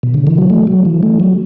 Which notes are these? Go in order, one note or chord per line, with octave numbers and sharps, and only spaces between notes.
B2
D3
E3
F#3
A3
F#3
E3
A3
F#3